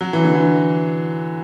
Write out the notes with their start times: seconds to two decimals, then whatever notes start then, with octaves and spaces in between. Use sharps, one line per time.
0.01 F#3
0.13 E3
0.25 D3
0.35 E3